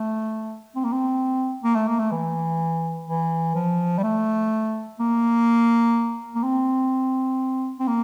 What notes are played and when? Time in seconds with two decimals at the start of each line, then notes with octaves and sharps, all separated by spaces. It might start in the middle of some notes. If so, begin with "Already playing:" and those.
Already playing: A3
0.76 C4
0.84 A#3
0.92 C4
1.63 A#3
1.75 A3
1.87 A#3
1.99 A3
2.11 E3
3.07 E3
3.55 F3
3.98 G3
4.04 A3
4.99 A#3
6.35 A#3
6.43 C4
7.79 C4
7.88 A#3